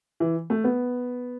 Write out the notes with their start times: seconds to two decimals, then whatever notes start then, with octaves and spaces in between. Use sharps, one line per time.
0.20 E3
0.50 A3
0.64 B3